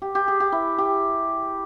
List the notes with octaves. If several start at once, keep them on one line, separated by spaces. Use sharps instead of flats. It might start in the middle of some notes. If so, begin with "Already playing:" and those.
G4
G4
G#4
G4
E4
G4